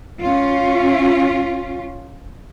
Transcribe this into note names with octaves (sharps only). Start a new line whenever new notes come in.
C#4 F4